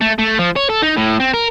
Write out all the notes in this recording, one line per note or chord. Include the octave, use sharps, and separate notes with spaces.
A3
A3
F3
C#5
A4
D#4
A2
C4
A#4